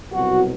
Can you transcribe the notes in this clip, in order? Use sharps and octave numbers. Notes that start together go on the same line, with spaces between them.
C2 B2 F#3 F#4